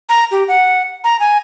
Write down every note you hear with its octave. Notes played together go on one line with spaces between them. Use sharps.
A#5
G4
F#5
A#5
G#5